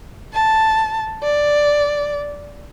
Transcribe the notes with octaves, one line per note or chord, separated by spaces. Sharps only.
A5
D5